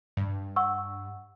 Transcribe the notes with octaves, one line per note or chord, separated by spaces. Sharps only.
G2
F#5 C#6 E6